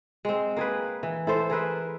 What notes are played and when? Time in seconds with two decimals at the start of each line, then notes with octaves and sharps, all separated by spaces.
0.25 G#3 C4
0.57 A#3 G#4 B4
1.03 E3
1.27 E4 A4 C5
1.50 G#4 A#4 B4 E5